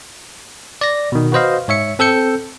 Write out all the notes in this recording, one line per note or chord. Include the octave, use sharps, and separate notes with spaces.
D5 A#6
B2 D#3
F#4 B4 C5 D#5 F5
G#2 C#5 E5 C#7
C4 A4 E6 G6 C#7